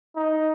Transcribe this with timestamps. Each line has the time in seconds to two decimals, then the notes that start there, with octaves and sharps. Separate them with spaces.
0.17 D#4